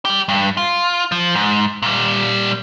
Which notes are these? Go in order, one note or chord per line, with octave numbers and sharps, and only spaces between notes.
G3 G4
G2
F4
F3
G#2
A#2 G3